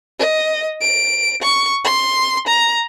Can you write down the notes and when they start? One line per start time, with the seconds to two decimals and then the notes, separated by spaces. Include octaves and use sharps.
0.19 D#5
0.81 D7
1.42 C#6
1.84 C6
2.47 A#5